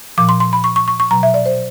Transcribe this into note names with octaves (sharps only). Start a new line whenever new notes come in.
A#2 F3 D6
C6
C6
B5
C#6
C#6
C#6
C#6
B2 F#3 A#5
E5
D5
C5